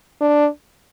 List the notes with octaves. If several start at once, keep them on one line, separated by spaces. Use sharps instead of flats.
D4